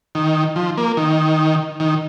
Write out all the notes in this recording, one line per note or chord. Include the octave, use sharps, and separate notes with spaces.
D#3
F3
A#3
D#3
D#3